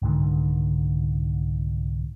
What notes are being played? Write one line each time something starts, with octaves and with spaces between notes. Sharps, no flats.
C2 G#2 D3 D#3